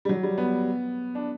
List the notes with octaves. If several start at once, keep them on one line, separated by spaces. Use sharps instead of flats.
G3
F#3
G3
B3
D4